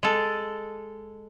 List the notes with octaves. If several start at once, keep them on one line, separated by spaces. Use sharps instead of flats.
G#3 A4